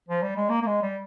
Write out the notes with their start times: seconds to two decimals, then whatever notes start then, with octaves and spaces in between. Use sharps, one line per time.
0.09 F3
0.22 G3
0.36 G#3
0.49 A#3
0.62 A#3
0.67 G#3
0.82 G3